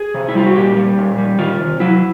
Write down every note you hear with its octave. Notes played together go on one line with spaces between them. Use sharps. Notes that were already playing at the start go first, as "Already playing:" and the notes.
Already playing: G#4
C3
E4
G3 F4
F#4
A#2 G4
G3
A#2
G3
D#3 F4
C3
F#3 E4